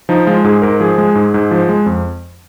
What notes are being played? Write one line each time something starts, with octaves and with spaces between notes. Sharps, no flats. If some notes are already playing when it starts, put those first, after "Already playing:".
F3 D#4
G#3 F4
G#2 G#4
G#2 A#4
F3 G#4
G#3
G#2
G#2
F3
G#3
F2